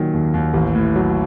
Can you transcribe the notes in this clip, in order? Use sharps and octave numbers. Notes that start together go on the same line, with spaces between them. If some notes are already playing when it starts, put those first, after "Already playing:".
Already playing: A#2 D#3 F#3
D#2
D#2
A1
A2
F#3